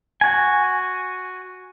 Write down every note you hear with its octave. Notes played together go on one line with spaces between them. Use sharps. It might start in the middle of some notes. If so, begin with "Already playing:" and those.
F#4 G#5